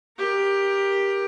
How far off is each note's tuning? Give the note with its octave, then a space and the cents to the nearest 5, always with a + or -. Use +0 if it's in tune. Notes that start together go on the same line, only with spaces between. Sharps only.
G4 +10 A#4 +20